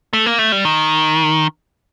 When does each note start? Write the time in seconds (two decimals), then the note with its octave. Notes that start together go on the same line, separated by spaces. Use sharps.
0.13 A3
0.26 A#3
0.39 A3
0.52 G3
0.65 D#3